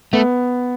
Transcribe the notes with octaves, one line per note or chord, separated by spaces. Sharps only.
A3 B3